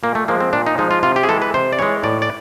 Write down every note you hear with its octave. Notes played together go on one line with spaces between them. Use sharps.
A#2 A#3
A3
F3 G#3 A#3
C4
A#2 D4
D#4
F3 G#3 D#4
F4
C3 F4
G4
G#4
E3 G#3 A4
B4
C3 C5
D5
E3 G#3 C#5
A2 D5
D5